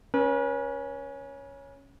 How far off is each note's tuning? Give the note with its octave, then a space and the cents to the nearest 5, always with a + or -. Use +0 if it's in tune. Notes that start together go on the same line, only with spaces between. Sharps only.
C#4 +0 B4 -45